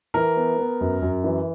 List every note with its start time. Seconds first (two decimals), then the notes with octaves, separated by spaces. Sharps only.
0.14 E3 A#4
0.36 B3
0.58 B3
0.81 F#2
1.02 F#2
1.24 E3